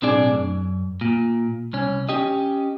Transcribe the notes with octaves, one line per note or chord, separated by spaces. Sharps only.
B1 A2 C4 D4 G#4 D5
F#2
A#2
C2 C#4
C#4 G4 D#5